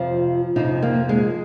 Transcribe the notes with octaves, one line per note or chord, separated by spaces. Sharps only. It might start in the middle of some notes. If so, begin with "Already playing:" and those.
Already playing: F2 C3 F3 F4
F2 C3 F3 D#4
A#3
G#3